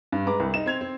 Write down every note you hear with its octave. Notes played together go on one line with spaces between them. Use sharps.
G2
G#3 B4 A#5 D6
C2
D#4 E7
C4 G#6 F7
C4